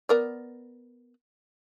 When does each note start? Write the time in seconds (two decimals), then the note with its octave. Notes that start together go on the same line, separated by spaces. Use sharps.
0.09 B3 A#4 D5